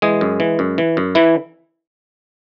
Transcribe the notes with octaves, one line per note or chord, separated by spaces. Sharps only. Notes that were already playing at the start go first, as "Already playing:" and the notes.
E3 G#3 G#4
F#2
E3
F#2
E3
F#2
E3 E4